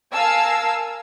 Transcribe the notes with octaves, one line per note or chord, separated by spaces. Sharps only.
A#4 F5 G#5 A5 E6